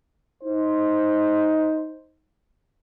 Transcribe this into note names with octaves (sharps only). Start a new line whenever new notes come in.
D#4 C5